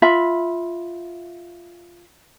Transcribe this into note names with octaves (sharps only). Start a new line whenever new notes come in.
F4 E5 B5